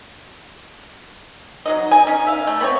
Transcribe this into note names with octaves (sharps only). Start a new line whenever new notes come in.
F#3 D#4 D#5
D#5 G#5
C#4 D#4
E5 F5
A3
B3 C4 C#5